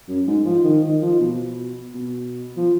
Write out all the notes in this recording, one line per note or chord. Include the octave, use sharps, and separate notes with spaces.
F#2
G#2
F3
D#3
D#3
F3
B2
B2
F3